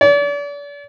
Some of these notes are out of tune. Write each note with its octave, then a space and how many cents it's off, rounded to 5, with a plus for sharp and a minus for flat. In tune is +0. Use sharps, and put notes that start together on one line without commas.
D5 -40